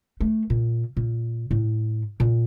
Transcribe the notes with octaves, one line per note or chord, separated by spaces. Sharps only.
A3
A#2
A#2
A2
A#2